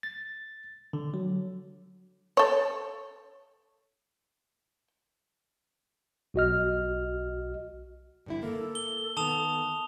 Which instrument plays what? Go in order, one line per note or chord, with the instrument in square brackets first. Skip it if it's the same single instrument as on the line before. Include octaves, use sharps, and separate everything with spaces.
[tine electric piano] A6
D3
F#3
[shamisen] A4 C#5
[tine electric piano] B1 F#4 D#5 F6
[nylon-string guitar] G2 D3 E4
[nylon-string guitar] A#3 [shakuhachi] A4
[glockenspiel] G7
[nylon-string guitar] D#3 B3 [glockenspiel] A5 D#6 F7